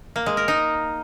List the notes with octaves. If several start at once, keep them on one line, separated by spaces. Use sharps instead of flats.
A#3
G#3
A#4
D#4